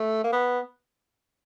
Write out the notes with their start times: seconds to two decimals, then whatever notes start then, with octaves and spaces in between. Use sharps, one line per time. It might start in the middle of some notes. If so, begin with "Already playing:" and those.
Already playing: A3
0.24 A#3
0.32 B3